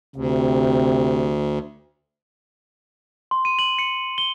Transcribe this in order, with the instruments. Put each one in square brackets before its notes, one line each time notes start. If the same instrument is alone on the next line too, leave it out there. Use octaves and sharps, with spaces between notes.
[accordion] D2 [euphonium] C3
[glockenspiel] C6
D#7
F#7
C#7
G7